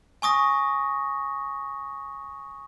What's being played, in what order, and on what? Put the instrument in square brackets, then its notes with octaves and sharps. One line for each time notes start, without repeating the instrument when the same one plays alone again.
[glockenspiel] G#5 C#6 D#6 A#6